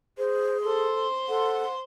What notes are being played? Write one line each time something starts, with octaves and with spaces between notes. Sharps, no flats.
G#4 C5
A4 C5 C6
A4 F#5